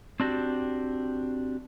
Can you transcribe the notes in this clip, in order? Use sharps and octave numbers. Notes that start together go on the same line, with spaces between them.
C4 D4 F#4 G4